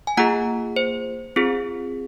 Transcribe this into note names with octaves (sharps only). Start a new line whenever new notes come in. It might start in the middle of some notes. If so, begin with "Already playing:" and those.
G#5
A#3 F4 G#4 F#5 A#5
C5
C4 F4 G#4